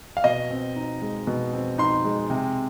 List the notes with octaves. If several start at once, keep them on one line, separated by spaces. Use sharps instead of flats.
F5
B2 D#5
C4
D#4
G#3
B2
C4
D#4 C6
G#3
C3